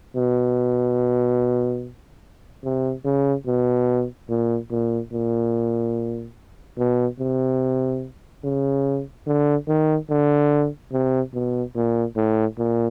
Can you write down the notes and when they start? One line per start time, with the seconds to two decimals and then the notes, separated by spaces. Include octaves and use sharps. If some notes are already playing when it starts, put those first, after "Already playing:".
0.16 B2
2.64 C3
3.05 C#3
3.47 B2
4.29 A#2
4.71 A#2
5.13 A#2
6.78 B2
7.20 C3
8.44 C#3
9.27 D3
9.68 D#3
10.10 D3
10.92 C3
11.34 B2
11.76 A#2
12.17 A2
12.58 A#2